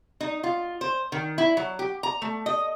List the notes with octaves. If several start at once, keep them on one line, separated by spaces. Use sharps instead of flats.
D#4
F4
C5
D#3
E4
F#3
G4
A#5
A3
D#5